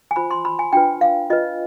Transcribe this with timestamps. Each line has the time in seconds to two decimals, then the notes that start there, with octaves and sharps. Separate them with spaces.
0.11 G#5
0.16 F4 C5 B5
0.31 C6
0.45 B5
0.59 G#5
0.73 D4 F4 B4 G5
1.01 F5
1.30 F4 B4 D#5